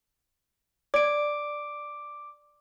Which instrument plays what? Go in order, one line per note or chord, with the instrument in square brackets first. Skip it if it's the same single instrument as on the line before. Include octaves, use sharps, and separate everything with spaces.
[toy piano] D5 [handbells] D6 D7